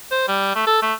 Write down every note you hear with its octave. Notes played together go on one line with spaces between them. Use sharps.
C5
G3
A3
A4
A3